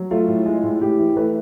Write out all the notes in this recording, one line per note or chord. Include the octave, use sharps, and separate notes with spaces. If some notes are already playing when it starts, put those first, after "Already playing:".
Already playing: F#3
A3 F4
A2
G#3
A2
A2 G4
E3
A3 B4